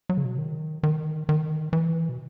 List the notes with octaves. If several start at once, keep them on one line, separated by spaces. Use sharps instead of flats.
F#3
C#3
B2
D#3
D#3
D#3
E3
B2